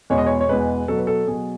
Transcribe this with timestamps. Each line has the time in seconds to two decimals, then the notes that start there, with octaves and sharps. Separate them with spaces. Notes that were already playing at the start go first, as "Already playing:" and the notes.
0.10 E2 B2 G#3 C#5
0.18 D#5
0.27 C#5
0.41 C#5
0.49 E2 B2 G#3 B4
0.88 B2 F#3 A4
0.97 B4
1.07 A4
1.28 B2 F#3 G#4